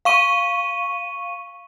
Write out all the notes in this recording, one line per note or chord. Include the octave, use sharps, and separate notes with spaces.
F5 C#6 D#7